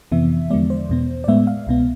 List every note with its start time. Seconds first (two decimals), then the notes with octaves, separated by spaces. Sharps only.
0.12 F2 C3 E3 B3 E5
0.50 E2 D3 F3 G#3 B3 D5
0.70 C5
0.89 E2 B2 B3
1.24 D5
1.28 A2 G#3 B3 E5
1.47 F5
1.67 C2 B2 B3